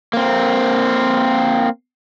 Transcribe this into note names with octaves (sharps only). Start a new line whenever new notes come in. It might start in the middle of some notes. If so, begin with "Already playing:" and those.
A#3 C4